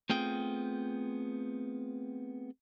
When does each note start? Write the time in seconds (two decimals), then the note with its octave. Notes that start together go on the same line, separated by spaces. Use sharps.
0.09 A3 B3 C4 F4 G#4 G5